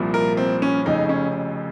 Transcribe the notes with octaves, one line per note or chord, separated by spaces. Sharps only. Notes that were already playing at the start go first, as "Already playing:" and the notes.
Already playing: C2 A#2 F3
A#4
C4
C#4
F1 F2 C#3 D#4
C#4